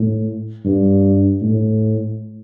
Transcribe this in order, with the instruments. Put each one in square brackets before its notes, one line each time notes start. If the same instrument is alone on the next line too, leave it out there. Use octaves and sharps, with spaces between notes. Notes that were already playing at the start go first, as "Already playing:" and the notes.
Already playing: [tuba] A2
G2
A2